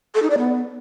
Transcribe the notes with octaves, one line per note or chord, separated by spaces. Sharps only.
A4
D#4
D5
B3